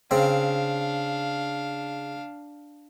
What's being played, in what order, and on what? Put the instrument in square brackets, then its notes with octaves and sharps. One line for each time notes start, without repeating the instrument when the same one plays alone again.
[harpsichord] C#3 C4 [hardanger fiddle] D4 F5